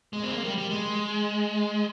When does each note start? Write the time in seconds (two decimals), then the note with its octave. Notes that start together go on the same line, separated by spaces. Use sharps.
0.13 G#3
0.23 C4
0.31 A#3
0.44 G3
0.58 G3
0.70 G#3